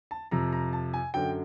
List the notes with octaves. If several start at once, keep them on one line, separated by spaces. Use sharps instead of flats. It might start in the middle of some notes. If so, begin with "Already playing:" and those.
A5
F2 C3 F3 A#5
A#5
A5
G#5
F#2 D3 F#3 G5